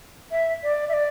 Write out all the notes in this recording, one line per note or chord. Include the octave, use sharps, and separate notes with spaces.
E5
D5
E5
D5